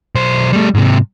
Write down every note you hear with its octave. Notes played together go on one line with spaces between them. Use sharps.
B1 C5
G3 A3
G#2 C3